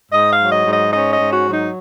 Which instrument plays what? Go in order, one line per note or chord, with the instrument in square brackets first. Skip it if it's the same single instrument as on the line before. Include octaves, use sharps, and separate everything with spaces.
[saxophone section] G#2 D#5
F5
F#3
D#5
G#2
D#5
C#4 D#5
D#5
G#2
F#4
F#3
D#4